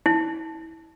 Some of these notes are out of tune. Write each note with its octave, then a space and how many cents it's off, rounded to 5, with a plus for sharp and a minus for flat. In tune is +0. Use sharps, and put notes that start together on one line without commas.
E4 -25